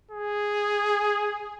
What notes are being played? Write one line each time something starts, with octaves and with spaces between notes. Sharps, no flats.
G#4